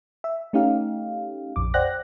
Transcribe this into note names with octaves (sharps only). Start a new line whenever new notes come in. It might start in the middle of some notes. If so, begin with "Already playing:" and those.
E5
A3 C#4 D#4 G4 F5
A#1 F2 D6
C5 D5 F#5 G5 F#6 A#6